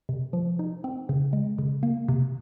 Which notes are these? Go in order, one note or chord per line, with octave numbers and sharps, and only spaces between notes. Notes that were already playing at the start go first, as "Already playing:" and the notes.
C3
F3
D#4
C4
C#3
G#3
C#3
A#3
C3